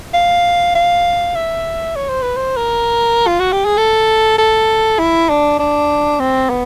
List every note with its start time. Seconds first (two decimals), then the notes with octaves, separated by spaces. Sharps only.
0.14 F5
0.75 F5
1.35 E5
1.96 C#5
2.09 C5
2.22 B4
2.36 C5
2.57 A#4
3.27 F4
3.40 F#4
3.52 G4
3.65 G#4
3.78 A4
4.38 A4
4.99 E4
5.30 D4
5.59 D4
6.20 C4
6.50 B3